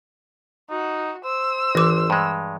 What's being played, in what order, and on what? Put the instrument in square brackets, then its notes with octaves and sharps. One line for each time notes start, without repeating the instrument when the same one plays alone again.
[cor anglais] D#4 [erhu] F#4
[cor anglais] C5 [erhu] E6
[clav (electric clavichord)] G#1 [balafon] E3 D6
[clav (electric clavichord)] G2 G#3